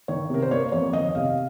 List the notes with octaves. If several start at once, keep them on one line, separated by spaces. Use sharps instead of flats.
D#3 C#5
C3 A#4
C5
A#3 C#5
F2 C#5
D#3 D#5
C3 F5